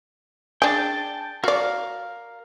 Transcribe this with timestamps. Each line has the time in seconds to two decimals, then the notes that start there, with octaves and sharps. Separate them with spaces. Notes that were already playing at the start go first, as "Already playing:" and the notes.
0.62 D4 G#4 G5 A5
1.44 F#4 A#4 D5 F5